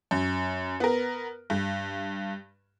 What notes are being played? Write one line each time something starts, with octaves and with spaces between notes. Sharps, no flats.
F#2
B3 A#4
G2